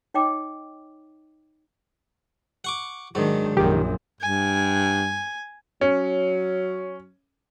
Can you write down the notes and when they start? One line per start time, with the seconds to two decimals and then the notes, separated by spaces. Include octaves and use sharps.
0.14 D#4 C#5 D#5 G5 D6
2.64 F#5 C#6 D6
3.15 G#2 D#3 F#3 D4
3.57 A#1 F#2 D#3 G4
4.21 G2 G#5
5.81 F#3 C#4